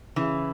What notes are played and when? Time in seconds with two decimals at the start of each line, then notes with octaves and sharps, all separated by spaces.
0.16 C#3 E3